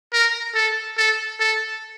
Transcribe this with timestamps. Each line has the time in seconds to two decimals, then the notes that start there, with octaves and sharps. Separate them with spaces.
0.13 A#4
0.55 A4
0.98 A4
1.40 A4